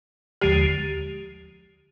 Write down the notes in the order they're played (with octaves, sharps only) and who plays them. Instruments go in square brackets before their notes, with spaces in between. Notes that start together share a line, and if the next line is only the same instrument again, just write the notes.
[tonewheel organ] D#2 D3 F3 G#3 [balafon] G4